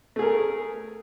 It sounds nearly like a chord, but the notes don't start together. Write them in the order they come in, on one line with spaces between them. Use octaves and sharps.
A3 G#4 A#4